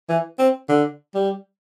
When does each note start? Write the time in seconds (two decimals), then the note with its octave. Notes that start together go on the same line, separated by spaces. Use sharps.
0.09 E3
0.39 C4
0.69 D3
1.15 G3